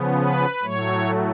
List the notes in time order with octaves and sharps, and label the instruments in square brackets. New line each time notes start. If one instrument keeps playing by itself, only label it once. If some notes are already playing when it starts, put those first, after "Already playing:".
Already playing: [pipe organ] C#3 F3 B3
B4
A2 F#3 A3 C#5